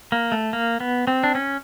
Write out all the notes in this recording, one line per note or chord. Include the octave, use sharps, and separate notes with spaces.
A#3
A3
A#3
B3
C4
D4
C#4